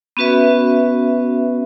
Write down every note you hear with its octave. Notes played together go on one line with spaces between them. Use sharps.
B3 C#4 F#4 B4 E5